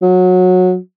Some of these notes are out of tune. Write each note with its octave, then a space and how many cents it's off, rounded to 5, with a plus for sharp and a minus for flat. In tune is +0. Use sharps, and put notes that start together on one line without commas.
F#3 -20